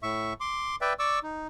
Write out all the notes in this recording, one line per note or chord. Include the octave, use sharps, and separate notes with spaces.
A2 E5 C#6
C6 D6
B4 D5 E5 G5
D5 C#6 D6 E6
D#4